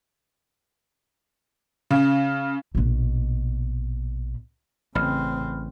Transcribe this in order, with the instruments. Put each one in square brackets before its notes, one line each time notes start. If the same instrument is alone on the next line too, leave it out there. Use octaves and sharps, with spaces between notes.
[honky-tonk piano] C#3
[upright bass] A#1 B2
[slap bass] A1 [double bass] C#3 C4 [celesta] B5 F6